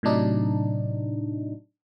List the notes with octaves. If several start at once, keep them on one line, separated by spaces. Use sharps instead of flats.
A2 C3 F#3 D4 D#4